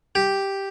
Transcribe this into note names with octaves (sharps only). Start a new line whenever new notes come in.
G4